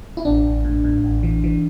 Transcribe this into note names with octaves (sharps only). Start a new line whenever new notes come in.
E4
A1 D4
A1
A2
A2
A1
E3
E3